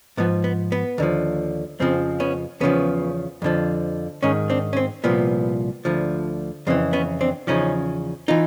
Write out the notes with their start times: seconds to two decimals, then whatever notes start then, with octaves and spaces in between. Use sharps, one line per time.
0.17 G#2 F3 B3
0.44 B3
0.72 B3
0.98 D#2 D3 F3
1.80 F2 C#3 F3 C4
2.20 B3 C#4
2.60 E2 C#3 F3 B3 C#4
3.42 F2 D3 F3
4.23 G#2 D#3 C#4 D#4
4.50 C4 D4
4.73 C#4
4.77 C4
5.04 C2 A#2 F3 B3
5.85 D2 D3 F3
6.67 F2 C#3 E3 C4
6.93 B3 C#4
7.21 C4 D4
7.47 E2 C#3 F3 C#4 D#4
8.28 E3 D#4 F4